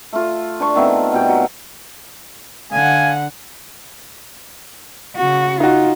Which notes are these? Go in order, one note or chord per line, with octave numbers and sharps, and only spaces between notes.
A3 F4
D4 A5 C#6
D#3 A3 B3 C4
B2 G3 G4
F#3
D3 F5 F#5 G#5
C#3 F#4
D#4 F4 F#4